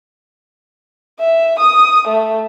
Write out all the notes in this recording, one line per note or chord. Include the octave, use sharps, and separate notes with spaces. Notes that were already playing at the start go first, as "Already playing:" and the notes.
E5
D#6
A3